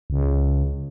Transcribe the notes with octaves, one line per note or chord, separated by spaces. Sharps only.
C#2